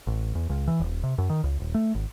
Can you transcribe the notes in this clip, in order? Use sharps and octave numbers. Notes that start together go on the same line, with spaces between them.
A1
E2
C#2
E3
D#1
C3
F#2
D#3
C#2
D#1
A3
G#1